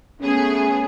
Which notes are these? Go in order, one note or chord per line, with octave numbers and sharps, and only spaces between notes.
A3 B3 C#4 G#4